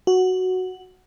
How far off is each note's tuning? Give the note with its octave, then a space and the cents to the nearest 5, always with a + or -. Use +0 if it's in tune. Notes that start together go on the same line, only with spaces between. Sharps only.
F#4 +0